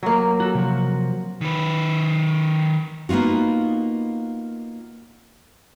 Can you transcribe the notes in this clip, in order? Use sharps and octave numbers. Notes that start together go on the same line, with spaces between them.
F#3 A#3
F#4 A4
C3 F3 F#4
D#3 B4
A#3 B3 D#4 F4 F#4